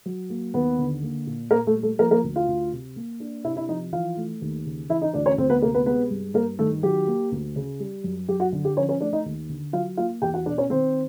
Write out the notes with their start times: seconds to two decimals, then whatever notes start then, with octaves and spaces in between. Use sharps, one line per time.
0.06 F#3
0.30 A#3
0.54 D#2 B3 B4
0.78 D3
1.03 A#3
1.27 A#2
1.51 A#2 A#3 A#4
1.67 A3 A4
1.75 G3
1.83 A3 A4
1.99 F3 A#3 A#4
2.11 A#3 A#4
2.24 D2
2.36 F4 F5
2.48 D2
2.72 C3
2.96 A#3
3.20 D4
3.44 C3 E4 E5
3.56 E4 E5
3.68 F3 D#4 D#5
3.92 E3 F4 F5
4.17 A3
4.41 D#2
4.65 C#3
4.89 E3 E4 E5
5.02 D#4 D#5
5.14 D2 D4 D5
5.26 C#4 C#5
5.38 D2 C4 C5
5.50 B3 B4
5.62 C3 A#3 A#4
5.74 B3 B4
5.86 G#3 B3 B4
6.10 G2
6.34 G2 A#3 A#4
6.59 D#3 A3 A4
6.83 F#3 G4
7.07 A#3
7.31 D2
7.56 C#3
7.80 G3
8.04 F#2
8.28 F#2 G4
8.40 F#4
8.52 D3
8.65 G4
8.77 F3 C#4 C#5
8.89 C#4 C#5
9.01 A3 D4 D5
9.13 D#4 D#5
9.26 D#2
9.49 D3
9.73 F#3 F4 F5
9.97 A#3 F4 F5
10.22 E2 G4 G5
10.34 F#4 F#5
10.46 B2 D4 D5
10.58 C#4 C#5
10.70 D#3 C4 C5